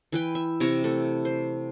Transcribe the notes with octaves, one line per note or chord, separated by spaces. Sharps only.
E3 B4 G5
E5
C3 E4 A#5 C#6
A3
C5